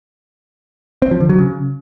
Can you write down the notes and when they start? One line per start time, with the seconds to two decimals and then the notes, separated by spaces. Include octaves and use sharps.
1.02 C4
1.11 F3
1.20 D3
1.30 F#3
1.39 C#3